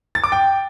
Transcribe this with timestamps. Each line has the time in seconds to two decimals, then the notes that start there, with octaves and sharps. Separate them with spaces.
0.15 A6
0.24 D6
0.32 G5